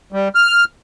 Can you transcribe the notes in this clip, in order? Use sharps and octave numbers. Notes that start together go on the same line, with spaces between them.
G3
F6